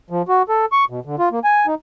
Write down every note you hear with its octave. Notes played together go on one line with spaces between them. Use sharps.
F3
F#4
A4
C#6
B2
D3
F4
A#3
G#5
D#4